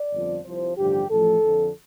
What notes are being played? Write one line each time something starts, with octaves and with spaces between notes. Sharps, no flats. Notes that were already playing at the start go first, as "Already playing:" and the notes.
Already playing: D5
G1 F2 F3
C2 C3 F3 C5
A1 G2 D3 F3 G4
A1 A2 F3 A4
F2 D3 F3